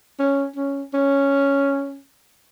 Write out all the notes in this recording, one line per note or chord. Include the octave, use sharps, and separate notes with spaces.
C#4
C#4
C#4